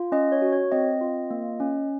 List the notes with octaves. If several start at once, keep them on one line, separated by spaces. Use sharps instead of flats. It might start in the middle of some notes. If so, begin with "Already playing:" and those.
Already playing: F4
C#4 D#5
C#5
F#4
C#5
C4 D#5
F4
A#3
C#4